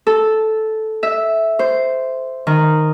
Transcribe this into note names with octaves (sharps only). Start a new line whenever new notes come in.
A4
E5
C5
D#3